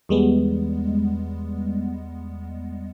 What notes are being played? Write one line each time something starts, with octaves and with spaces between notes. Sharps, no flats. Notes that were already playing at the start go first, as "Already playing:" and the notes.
E2 G3 G#3 B3